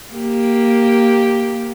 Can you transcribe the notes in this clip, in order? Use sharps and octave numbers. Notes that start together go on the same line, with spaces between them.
A#3 G4